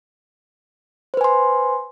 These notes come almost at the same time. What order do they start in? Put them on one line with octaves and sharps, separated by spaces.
C5 B4 G#5 C6